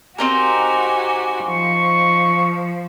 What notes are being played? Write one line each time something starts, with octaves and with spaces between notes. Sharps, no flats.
C4 D#4 F#4 G4 A#4 G#5
F3 C#6